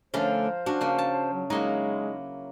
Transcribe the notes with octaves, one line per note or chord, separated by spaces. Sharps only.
D3 F3 A3 C#4 A#4 C5 F5
C#4 D4 F#4
C#3 A#3
A5
F#3
F#3 G#3 A#3 D#4 E4